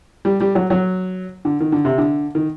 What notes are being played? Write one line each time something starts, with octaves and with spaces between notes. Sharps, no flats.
G3
G3
F#3
F#3
D3
D#3
D3
C3
D3
D#3